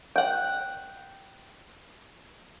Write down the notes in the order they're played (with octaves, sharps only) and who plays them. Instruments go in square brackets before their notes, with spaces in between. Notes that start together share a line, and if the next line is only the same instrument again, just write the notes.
[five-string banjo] F#5 G5